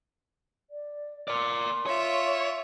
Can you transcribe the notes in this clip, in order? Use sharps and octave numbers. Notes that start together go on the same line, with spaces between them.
D5
A#4 D5 C6
F4 C#5 E5